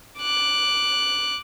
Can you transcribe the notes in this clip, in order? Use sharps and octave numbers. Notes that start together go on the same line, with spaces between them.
D6 F#6